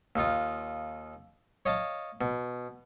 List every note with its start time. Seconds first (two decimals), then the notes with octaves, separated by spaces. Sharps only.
0.16 D#2 D#4 F4
1.66 C#5 D#5 F5 A5
2.21 B2